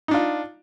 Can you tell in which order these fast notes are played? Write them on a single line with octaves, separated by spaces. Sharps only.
D#4 D4 F4